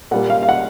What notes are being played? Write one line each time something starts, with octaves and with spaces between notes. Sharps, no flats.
A#2 G3 A#3 F#5
F5
F5
F#5